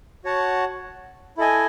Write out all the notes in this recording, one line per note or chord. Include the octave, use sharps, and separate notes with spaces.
F#4 C#5 F#5 A5
E4 A4 D#5 G#5